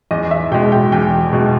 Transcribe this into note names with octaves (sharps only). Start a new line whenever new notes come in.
E2 D#5
E5
B2 G#3 G5
G5
E2 G5
B2 G#3